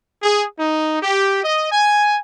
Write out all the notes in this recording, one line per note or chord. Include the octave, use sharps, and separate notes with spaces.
G#4
D#4
G4
D#5
G#5